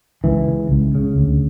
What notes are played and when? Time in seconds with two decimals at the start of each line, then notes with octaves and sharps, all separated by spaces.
0.24 C#2 E3
0.48 C#3
0.71 C#2
0.95 C#3
1.18 D2